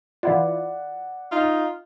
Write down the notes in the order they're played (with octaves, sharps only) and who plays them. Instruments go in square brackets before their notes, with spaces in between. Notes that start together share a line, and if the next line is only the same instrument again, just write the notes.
[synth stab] E3 E4 F4 [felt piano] D5 F#5
[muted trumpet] D#4 [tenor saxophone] F4